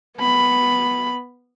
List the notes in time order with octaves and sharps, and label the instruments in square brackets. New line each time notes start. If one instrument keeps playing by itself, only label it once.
[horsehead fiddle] B3 B5